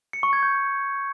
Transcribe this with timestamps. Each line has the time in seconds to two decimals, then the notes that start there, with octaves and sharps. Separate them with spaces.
0.13 C#7
0.23 C#6
0.33 G#6
0.43 G6